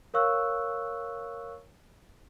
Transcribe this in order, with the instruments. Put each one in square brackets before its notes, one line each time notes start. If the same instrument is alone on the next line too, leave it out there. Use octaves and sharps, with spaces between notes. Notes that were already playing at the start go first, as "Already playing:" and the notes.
[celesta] A#4 C#5 F5 C#6 E6 F#6